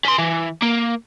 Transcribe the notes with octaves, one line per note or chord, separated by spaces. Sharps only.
C#4 C6
E3
A#3